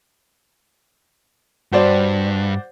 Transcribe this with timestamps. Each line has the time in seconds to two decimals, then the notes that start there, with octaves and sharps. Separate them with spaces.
1.72 G2 F#4 C5 D5